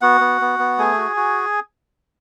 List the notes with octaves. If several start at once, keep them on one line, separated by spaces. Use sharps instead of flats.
B3 F#4 F#5
B3
B3
B3
A3 G#4 G#5
F#4
F#4